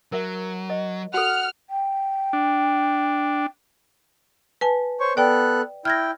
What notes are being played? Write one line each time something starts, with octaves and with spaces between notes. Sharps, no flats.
F#3 A#4 E5
D#5
F#4 A4 F#5 F6
G5
D4
B4 G#5 A5
C5 C#5 C#6
B3 A4 D5 G5 F#6
E4 G5 F6 G#6 A#6